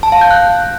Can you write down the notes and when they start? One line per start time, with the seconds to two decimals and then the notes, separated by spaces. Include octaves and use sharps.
0.03 A5
0.12 F5
0.21 G6
0.31 F#6